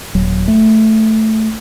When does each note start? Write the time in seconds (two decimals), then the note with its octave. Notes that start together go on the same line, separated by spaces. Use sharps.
0.15 D#1 F#3
0.48 A3